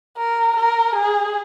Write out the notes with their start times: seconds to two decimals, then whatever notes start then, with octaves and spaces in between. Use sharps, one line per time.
0.17 A#4
0.56 A#4
0.95 G#4